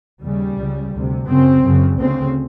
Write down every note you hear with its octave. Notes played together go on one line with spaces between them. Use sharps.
D#2 C#3 G3
C#2 C#3
D2 C3
F#2 C#3 C4
F#2 C#3
D2 C#3 C4